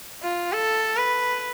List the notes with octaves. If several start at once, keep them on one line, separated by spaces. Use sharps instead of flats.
F4
A4
B4